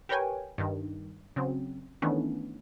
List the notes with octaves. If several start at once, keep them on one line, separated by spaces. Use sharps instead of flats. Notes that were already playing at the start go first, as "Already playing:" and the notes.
G4 A#4 B4 C#5 G5 G#5
G2 D#3
C#3 F#3 C4
D#3 E3 A3 B3 C#4 D4